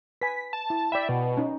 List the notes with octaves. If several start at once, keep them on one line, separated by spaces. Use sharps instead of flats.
B4 G#5 B6
A5
E4
D5 E5 G5 B5
B2
C#4 D#4